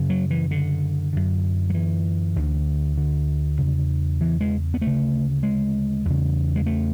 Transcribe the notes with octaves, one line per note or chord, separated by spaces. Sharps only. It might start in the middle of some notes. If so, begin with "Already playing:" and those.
Already playing: F#2 C#3
F#3
E3
D3
F#2 D3
F#3
E3
D2 D3
D3
E2 C#3
E3
G#3
B3
D2 C#3 A3
G#3
E2 C#3
G#3
A3